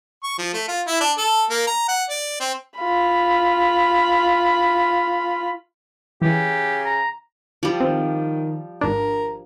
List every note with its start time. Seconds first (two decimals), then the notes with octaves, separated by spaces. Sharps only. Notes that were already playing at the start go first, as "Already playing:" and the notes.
0.23 C#6
0.38 F3
0.53 A3
0.68 F4
0.87 E4
1.00 D4
1.18 A4
1.50 A#3
1.67 A#5
1.88 F#5
2.10 D5
2.40 C4
2.79 F4 B5
6.22 C#3 E3 G4
6.86 A#5
7.63 F3 G3
7.80 D#3 C4
8.81 G#1 D4 A#4